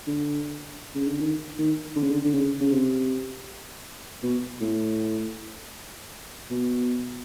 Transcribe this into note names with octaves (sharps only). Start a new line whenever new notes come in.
D3
C#3
D3
D#3
D#3
D3
C#3
D3
D3
C#3
C#3
C3
B2
A2
B2